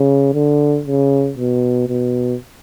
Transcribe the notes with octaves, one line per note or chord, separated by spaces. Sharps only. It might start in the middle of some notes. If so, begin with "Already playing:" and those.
Already playing: C#3
D3
C#3
B2
B2